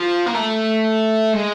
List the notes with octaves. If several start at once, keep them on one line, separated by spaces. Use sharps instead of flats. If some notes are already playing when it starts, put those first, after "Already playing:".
Already playing: F3
A#3
A3
G#3